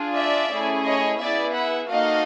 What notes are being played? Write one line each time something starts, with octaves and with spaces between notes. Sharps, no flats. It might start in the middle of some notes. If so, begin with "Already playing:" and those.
Already playing: D4 F4 G#4
D5 E5
A3 C#4 E4 G#4
C#5 D#5
B3 E4 G#4 D5 E5
E5 F#5
A#3 D#4 F#4 A4 D#5 F5